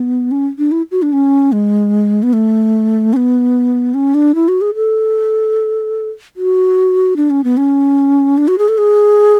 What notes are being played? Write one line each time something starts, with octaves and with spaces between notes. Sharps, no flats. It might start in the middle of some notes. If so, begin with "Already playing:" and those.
Already playing: B3
C#4
D4
E4
F#4
D4
C#4
G#3
B3
A3
C#4
B3
C#4
D4
E4
F#4
G#4
A4
F#4
D4
C#4
B3
C#4
D4
F#4
G#4
A4
G#4